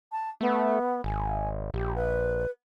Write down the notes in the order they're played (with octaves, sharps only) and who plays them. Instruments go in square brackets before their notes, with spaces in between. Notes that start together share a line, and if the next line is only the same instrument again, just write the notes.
[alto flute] A5
[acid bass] A3 [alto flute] B3
[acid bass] G#1 [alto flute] G#5
[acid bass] A#1 [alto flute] G4
[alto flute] B4